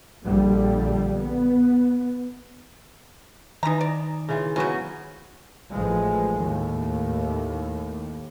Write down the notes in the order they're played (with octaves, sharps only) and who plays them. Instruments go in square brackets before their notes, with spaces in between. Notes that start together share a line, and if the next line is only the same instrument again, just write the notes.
[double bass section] A#1 D3 G3
B3
[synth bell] D#3 D#4 [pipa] E3 A#5
[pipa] D5
[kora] C#3 E3 F4
[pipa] C#3 C#4 [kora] F#3 B3 F#4
[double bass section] A1 F3 G#3
D#2 A2